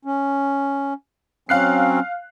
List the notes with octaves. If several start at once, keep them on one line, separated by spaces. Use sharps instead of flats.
C#4
F#3 C4 C#4 F5 F#6 C7